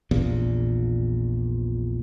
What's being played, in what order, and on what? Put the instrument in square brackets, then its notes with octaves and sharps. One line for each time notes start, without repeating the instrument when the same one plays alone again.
[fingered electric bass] A#1 E2 A#2